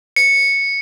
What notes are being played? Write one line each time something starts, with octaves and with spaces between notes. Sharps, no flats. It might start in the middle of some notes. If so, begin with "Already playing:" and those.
C#7